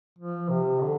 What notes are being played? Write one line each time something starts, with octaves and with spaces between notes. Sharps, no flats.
F3
C3
D3